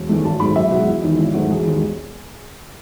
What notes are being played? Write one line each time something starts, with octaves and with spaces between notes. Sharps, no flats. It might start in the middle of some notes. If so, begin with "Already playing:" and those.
Already playing: E1
E2 D#3 F#3 A3
G#1 A5
G#2 F#3 A3 B5
B1 E5
B2 G#3 F#4
E1 E4
E2 D#3 D#4
G#1 E4
G#2 F#3 A3 F#4
E1 G#4
D#2 D#3 G#3